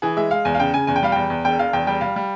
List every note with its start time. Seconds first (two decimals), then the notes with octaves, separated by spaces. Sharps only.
0.02 E3 G#4
0.17 G#3 E5
0.31 G#3 F5
0.45 E2 G#5
0.55 F5
0.60 C#3 G5
0.73 C#3 G#5
0.87 E2 G#5
0.96 G5
1.03 G3 F5
1.12 E2 G5
1.30 E2
1.45 E1 G5
1.59 E1 F5
1.73 E2 G5
1.87 G3 G5
2.01 G3 F5
2.16 G3